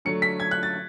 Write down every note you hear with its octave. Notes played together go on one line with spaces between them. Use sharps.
D3 F#3 A3 C#7
B6
G#6
F#6
A6